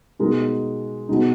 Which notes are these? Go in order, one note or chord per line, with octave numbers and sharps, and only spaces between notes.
B2 G#3 D#4 A#4
B2 G#3 D#4